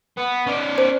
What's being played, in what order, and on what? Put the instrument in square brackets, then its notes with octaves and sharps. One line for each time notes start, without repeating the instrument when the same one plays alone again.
[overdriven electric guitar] B3
C#4 D5
[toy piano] C5